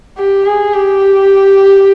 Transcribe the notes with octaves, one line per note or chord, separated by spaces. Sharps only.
G4
G#4
G4